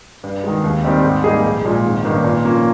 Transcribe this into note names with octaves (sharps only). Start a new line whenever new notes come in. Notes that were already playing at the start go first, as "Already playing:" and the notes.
G2
D#3 G#3
D#2
D#3 G3 C4
G#2
G3 A#3 D#4 G#4
A#1
A#2 G#3
G#1
G2 D#3 A#3 C#4
A#2
F3 A#3 C#4